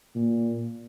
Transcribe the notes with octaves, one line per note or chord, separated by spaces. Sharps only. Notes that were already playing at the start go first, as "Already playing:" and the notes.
A#2